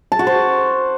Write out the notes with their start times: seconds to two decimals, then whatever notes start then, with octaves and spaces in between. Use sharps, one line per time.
0.12 A5
0.19 F#4
0.27 C5